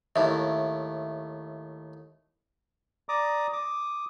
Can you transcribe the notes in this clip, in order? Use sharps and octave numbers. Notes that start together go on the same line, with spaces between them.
D#2 A2 E5
D5 A#5 D6 D#6
D6 D#6